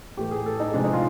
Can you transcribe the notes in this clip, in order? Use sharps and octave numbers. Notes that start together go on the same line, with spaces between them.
A2 E3 A3 G4
G#4
A4
D#4
C3 F3 G#3 D4
D#4
F4